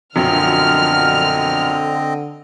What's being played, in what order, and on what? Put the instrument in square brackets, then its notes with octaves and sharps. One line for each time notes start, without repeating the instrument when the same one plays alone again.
[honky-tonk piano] A#1 F#2 B2 [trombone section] D3 [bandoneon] C4 D#5 [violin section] F6